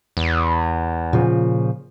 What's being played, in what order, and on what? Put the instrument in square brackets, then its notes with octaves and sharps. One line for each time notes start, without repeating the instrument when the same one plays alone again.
[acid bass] E2
[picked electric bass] A#2 C#3 F3